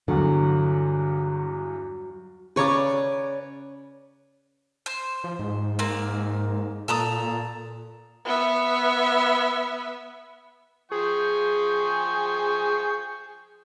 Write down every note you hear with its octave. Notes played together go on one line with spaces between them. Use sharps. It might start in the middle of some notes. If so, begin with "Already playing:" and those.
E2 G2 D3 F#3
C#3 B4 C#5 D5 A#5 D6
C5
F3
G#2
A#3 C4
A#2 A4 A#5 D#6
B3 E5
F3 G#4 G5 C#6